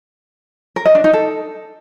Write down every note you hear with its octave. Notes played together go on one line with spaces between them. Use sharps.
A#4
D#5
D4
D#4
A4